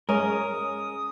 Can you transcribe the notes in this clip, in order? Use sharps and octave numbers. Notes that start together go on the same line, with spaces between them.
G#3 C#4 A#4 D#6